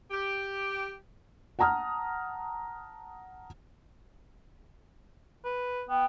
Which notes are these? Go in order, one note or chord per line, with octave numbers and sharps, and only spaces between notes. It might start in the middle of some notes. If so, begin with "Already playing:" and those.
G4
F#5 A5 A#5 D#6 F6
B4
B3 G5